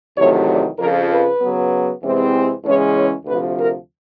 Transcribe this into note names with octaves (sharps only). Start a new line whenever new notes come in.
E2 C3 D#3 F#3 A3 C#5
D5
F2 C#3 F3 A#4
B4
C#3 F#3 B3
E2 C3 E3 G#3 C4
E2 C#3 E3 G#3 C#4 C#5
C#5
D2 C3 F3 B4
A#4